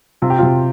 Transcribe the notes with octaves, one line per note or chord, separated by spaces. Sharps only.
C3 F4
G4
C3 F4